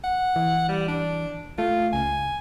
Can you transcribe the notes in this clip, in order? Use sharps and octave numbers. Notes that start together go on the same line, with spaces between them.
F#5
E3
G3
D4
A3 F4
C#2 G#5